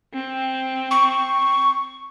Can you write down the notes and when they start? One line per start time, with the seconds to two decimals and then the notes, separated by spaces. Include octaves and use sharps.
0.14 C4
0.91 C#6